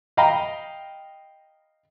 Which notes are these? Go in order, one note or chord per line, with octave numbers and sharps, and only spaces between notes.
D#5 F5 G5 A#5 B5